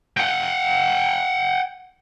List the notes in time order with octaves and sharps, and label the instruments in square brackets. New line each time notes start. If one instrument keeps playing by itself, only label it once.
[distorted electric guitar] F#5 G5